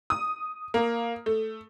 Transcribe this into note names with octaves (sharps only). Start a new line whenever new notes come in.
D#6
A#3
A3